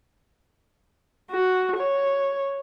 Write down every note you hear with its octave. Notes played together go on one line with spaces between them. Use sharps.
F#4
C#5